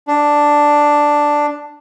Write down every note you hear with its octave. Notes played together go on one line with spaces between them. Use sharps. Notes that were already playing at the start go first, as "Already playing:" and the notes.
D4